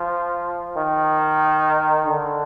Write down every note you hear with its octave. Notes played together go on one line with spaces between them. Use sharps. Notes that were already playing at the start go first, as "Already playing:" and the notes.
Already playing: F3
D#3
D3